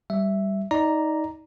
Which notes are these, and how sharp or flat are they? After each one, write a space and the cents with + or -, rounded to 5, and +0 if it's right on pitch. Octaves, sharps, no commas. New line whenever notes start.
G3 +0 E5 +0
D#4 +20 D5 +0 A#5 +0